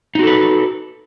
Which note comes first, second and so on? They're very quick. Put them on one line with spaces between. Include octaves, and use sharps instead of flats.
D#4 F#4 A4 B4